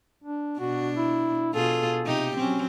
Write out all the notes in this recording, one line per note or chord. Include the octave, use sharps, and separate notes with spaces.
D4
B2 D4 F#4
E4
B2 F4 G#4 A4
C3 D#4 G4
F#3 C4 C#4